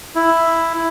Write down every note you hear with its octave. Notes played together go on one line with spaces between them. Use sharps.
E4